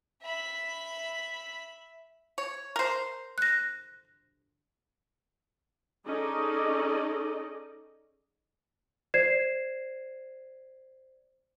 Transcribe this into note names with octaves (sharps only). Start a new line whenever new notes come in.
E5 B5
C#5
A#4 C5
F#6 A#6
C#4 D#4 G#4 A4 D5 D#5
C5 D5 G#6 C7 E7